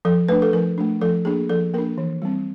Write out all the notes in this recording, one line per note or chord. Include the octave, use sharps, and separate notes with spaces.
F3 A4
A3 D4 B4
A4
F3 A#4
A3 D4
F3 A4
A#3 D4 G#4
F3 A4
A#3 D4 A#4
E3
G3 C4